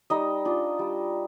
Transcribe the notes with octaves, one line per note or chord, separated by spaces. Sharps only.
G3 D#4 D#5
D4 F4
G3